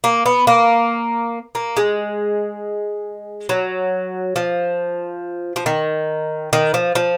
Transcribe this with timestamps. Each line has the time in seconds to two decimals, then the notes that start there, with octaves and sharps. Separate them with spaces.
0.04 A#3
0.26 B3
0.47 A#3
1.55 A#3
1.77 G#3
3.49 F#3
4.36 F3
5.56 F3
5.66 D#3
6.53 D#3
6.74 F3
6.95 F3